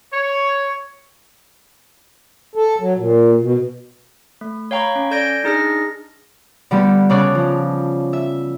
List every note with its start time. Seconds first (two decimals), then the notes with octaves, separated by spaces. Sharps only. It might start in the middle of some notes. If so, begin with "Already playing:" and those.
0.12 C#5
2.56 A4
2.80 F#3
2.97 A#2
3.41 B2
4.41 A3
4.71 C#5 F5 G5 A#5 B5 C#6
4.96 C#4
5.11 A4 D5 G6 G#6 A#6 D7
5.44 D4 D#4 G#4 F6 A#6
6.71 D3 G3 B3 G4
7.10 C#3 C#5 D5 A5 F#6
7.35 F3
8.13 E5